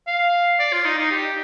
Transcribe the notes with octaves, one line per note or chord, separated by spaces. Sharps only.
F5
D5
F4
D#4
D#4
G4